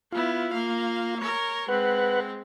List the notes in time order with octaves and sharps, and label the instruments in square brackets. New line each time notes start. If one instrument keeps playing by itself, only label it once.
[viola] B3 E4 [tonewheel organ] F4
[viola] A#3 F5
A#4 C#5
[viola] G#3 C4 [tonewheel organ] B4 F#5